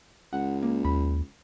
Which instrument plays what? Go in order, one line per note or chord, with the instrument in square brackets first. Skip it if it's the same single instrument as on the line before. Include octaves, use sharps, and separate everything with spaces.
[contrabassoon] C#2 [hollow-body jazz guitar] F#5
[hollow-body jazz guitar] A#3
[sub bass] D#2 [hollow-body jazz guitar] B5